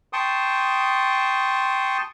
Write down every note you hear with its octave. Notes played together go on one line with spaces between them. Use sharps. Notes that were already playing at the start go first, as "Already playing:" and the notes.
G5 A5 C6 C#6 D#6